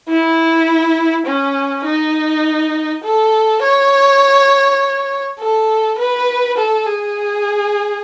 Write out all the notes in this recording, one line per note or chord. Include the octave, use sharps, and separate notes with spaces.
E4
C#4
D#4
A4
C#5
A4
B4
A4
G#4